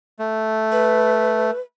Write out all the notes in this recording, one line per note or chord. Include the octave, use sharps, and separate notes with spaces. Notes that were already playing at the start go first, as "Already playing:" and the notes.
A3
B4